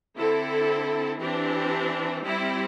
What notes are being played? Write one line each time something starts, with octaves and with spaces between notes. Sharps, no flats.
D3 C4 E4 A4
E3 C4 D4 G4
G3 C4 E4